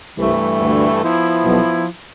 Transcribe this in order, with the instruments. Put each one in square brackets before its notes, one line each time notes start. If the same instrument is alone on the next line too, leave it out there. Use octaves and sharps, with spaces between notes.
[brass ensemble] C2 C3 [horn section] G2 E3 A3
[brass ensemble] D2 D3
[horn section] F3 B3 E4
[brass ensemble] B1 B2